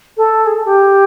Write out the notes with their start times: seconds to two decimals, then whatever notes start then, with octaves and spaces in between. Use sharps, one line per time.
0.17 A4
0.46 G#4
0.56 A4
0.66 G4